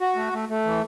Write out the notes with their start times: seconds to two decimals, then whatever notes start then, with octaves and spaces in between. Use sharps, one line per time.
0.01 F#4
0.16 A3
0.33 A3
0.49 A3
0.65 E3